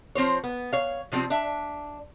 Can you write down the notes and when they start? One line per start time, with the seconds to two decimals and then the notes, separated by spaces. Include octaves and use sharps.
0.15 F3 C4 C5 C#5
0.44 B3
0.73 C#5 F5
1.12 C3 F3 G3 G#3 C4
1.30 D4 E5